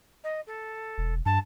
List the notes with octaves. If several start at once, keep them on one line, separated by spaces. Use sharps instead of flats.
D#5
A4
E1
G2 A5